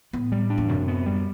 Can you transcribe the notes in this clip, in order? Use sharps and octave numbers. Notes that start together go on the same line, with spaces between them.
A2 B3
G3
D4
E2
F#2 C3
B3
G3